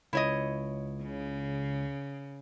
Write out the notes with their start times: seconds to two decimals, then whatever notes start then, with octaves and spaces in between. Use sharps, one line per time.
0.13 C#2 E4 C#5 D#5
1.03 C#3